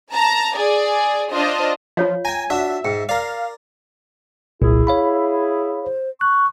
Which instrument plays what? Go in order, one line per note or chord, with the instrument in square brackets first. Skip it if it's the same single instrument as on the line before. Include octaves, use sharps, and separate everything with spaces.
[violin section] A5 A#5
G#4 D5
D4 F4 C5 D#5
[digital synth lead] F3 [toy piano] F4 C#5 F5
[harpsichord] G5 A#5 [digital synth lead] G#5
[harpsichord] D4 F#4 [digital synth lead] E5
[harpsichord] G#2 [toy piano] G5
[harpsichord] A#4 D5 [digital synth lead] F5
[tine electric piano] G1 C2 A#2 [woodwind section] E4 G#4
[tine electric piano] C#5 F5 B5
[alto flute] C5
[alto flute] C#6 [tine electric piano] F#6